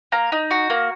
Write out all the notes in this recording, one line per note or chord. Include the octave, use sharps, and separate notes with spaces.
A#3 A#5
D#4
F#4
A#3